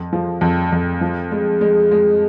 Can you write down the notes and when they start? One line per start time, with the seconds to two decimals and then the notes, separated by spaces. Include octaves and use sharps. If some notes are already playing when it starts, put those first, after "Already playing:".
Already playing: F2
0.13 F3
0.41 F2
0.72 F2
1.01 F3
1.31 G#3
1.61 G#3
1.91 G#3